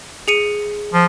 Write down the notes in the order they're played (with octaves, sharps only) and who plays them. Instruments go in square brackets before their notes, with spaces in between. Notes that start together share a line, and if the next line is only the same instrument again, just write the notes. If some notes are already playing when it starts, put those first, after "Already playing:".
[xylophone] G#4 C#7 D#7
[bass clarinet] F3